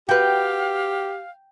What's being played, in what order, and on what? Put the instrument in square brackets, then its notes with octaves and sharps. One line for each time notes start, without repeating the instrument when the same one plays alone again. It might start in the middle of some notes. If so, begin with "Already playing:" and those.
[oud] F#4 B4 [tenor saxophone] G4 [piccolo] F5 [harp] G5 G6